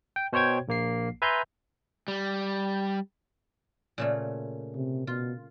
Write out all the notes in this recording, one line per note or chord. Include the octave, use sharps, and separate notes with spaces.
G5
B2 C5 C#5 G5 G#6
A#1 A#3 C7
B4 E5 G#5 A#5 C6 G6
G3
A#2 C#3 A3
C3
B2 F4